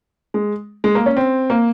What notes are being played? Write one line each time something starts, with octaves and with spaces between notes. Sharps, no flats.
G#3
G#3
A#3
C#4
C4
A#3